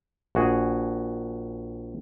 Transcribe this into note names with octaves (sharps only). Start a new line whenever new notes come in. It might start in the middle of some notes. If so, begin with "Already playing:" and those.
A#1 F#4 G#4